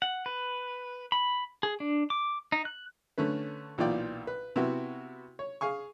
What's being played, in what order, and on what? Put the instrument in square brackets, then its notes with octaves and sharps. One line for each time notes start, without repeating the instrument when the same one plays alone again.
[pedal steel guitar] F#5
B4
B5
G#4
D4
D6
D#4
F#6
[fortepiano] D3 A3 C#4 B4
B1 A#2 E3 F4 D5 G5
B4
C3 B3 E4 F#4
C#5
G#4 F5 G#5 C#6